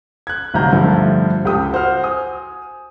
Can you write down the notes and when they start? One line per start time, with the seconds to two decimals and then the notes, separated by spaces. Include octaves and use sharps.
0.27 F#6 G#6
0.54 D1 C2 D#4 A#5 G6
0.73 G2 D3 F3 A3
1.45 C#2 G4 A4 G5 D#6
1.73 F#4 C5 F#5 F6
2.03 G#5 D#6